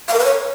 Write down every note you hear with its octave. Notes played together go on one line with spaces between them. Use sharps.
F5
A#4
B4
C#5